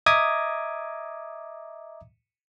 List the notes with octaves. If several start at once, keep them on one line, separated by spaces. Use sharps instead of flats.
D#5 E5 A#5 D6 D#6 G#6